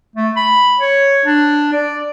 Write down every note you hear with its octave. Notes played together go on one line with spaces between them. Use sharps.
A3
B5
C#5
D4
D5